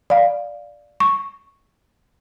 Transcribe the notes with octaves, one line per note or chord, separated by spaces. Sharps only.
D5 F5
C#6